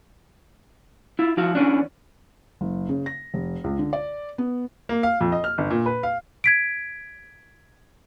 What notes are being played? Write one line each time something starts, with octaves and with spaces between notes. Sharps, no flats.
E4 F4
F3 E4 F#4 F5
E3 C#4 D4
F#1
C#3
A#6
F1
C#2
D3
D5
B3
A#3
F5
F2
D#5
F6
G1
A#2
B4
F5
G#6 B6 D7